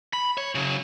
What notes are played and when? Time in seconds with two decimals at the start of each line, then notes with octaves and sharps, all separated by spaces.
0.13 B5
0.38 C#5
0.55 C#3 F#3